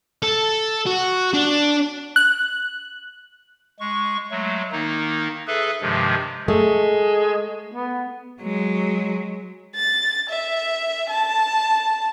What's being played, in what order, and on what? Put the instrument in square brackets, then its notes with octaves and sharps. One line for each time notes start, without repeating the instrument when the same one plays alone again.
[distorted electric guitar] A4
F#4
D4
[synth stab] F#6
[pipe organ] G#3 C#6
F#3 G#3 A3
D#3 A#3 D#4
G#4 A4 B4 E5
G2 C3 D#3 F3 G#3
[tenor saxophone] G#3 [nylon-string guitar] A3
[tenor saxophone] B3
[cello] F#3 G#3
[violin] A6
E5
A5